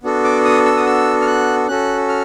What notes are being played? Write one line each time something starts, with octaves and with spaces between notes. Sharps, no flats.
B3 D4 F#4 A4
D6
D#6
E6
D#6
E6
F6
F#6
C#4 F#4 A4 F#6
F6